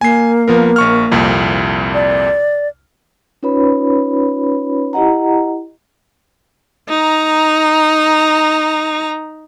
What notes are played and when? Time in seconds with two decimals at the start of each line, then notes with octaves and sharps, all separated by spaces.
0.01 A#3 G#5 C7
0.48 F3 B3 A#4
0.76 A#1 C#6 F6
1.11 C2 F2 A#2
1.94 D5
3.43 C#4 D#4 F4 B4 C#5 B5
4.93 E4 G4 D#5 F#5 A#5
6.89 D#4 A#5